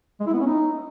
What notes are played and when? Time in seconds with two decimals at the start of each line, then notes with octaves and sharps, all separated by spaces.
0.20 G#3
0.27 E4
0.33 B3
0.40 C#4
0.47 D#4